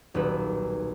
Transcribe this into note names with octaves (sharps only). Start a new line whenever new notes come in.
D#1 B1 B4